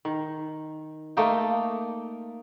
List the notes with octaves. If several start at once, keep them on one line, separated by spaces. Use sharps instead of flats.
D#3
A3 A#3 D#4 G5